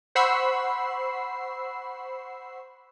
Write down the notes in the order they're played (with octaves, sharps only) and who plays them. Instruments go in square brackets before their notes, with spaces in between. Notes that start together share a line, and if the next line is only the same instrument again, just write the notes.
[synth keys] C5 F#5 B5 C#6 E6 C7